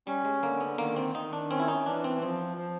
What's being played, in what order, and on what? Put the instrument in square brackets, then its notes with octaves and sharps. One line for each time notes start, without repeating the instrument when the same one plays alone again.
[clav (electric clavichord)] G3 [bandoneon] C#4
[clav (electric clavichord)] G#3
[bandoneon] D3 [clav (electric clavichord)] A#3
[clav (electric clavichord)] B3
[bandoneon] D#3 [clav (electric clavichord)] A#3
[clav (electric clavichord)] C4
[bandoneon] D#3 [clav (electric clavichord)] D#4
[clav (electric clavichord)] D4
[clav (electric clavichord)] C4 [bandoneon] C#4
[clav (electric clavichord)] E4
D#4
[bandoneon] E3 [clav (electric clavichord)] D4
[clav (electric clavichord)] C4
[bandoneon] F3 [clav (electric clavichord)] C4
[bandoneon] F3